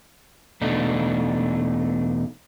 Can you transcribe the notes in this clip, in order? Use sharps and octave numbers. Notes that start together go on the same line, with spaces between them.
E2 B2 A3 D4 D#4